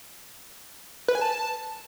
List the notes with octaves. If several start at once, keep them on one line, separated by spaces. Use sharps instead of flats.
B4
G#5
A5